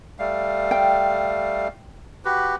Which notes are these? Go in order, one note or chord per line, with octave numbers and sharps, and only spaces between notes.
G3 A3 F5
G5
F#4 G4 B4